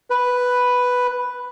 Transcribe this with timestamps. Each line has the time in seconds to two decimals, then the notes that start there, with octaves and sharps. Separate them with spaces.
0.10 B4